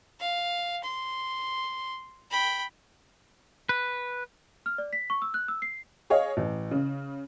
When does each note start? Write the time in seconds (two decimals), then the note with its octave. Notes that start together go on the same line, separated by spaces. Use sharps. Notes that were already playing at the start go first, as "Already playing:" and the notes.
0.20 F5
0.84 C6
2.30 G5 B5
3.69 B4
4.66 F6
4.78 D5
4.93 B6
5.10 C#6
5.22 E6
5.34 F#6
5.48 E6
5.62 C7
6.10 G#4 C#5 D#5 F5
6.37 A1
6.71 C#3